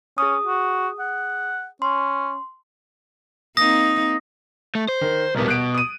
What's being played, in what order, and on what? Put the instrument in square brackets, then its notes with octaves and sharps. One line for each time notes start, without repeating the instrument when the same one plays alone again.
[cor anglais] C#4 [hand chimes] G#4 D#6
[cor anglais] F#4
F#5
[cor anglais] C#4 [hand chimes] C6
[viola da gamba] A#3 C4 D#4 [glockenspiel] D#6 A#6
[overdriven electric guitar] A3
C5
[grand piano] D#3
[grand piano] D#1 A#4 [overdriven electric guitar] C2 B3
[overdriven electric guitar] B2 [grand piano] F#6 D7
[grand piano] D#6 D#7